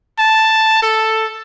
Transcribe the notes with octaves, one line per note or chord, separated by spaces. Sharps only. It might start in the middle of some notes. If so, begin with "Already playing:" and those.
A5
A4